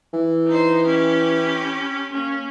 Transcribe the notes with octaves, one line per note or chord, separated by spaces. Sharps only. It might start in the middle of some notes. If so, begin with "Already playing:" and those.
E3
D#4 C5
C#4 G4 B5
A#3 C#4